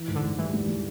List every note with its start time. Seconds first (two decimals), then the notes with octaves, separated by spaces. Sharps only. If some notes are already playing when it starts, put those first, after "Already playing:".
Already playing: E3
0.08 G#2
0.15 D3
0.23 G#2
0.38 E3 G3
0.53 G3
0.68 G3